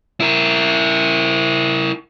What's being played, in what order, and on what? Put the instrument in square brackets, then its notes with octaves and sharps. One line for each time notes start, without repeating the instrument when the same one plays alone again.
[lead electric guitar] E4 A#4